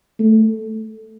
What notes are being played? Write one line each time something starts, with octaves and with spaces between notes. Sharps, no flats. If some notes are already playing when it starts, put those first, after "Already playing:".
A3